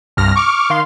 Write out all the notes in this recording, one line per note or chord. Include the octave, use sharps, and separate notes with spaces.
C2 G2 F6 A#6
C#6 D6 F6
D#3 F5 C6